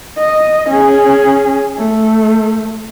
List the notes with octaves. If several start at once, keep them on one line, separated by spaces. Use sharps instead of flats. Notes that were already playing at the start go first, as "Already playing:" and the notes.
D#5
C#4 G#4
A3